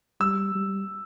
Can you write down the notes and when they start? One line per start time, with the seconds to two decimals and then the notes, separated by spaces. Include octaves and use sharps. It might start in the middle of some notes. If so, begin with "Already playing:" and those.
0.20 G3 E6
0.55 G3